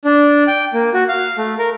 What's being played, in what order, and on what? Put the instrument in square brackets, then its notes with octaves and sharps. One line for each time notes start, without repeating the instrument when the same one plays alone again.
[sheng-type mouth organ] D4
G5
A#3
F#4
F5
A3
A#4